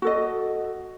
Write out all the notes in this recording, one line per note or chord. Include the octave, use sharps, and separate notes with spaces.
F#4 A4 D#5